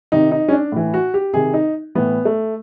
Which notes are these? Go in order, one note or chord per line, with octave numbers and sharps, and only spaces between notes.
C3 D#3 D#4
D#4
C#4
D4
A2 E3
F#4
G4
C3 D#3 G#4
D#4
A2 E3 B3
A3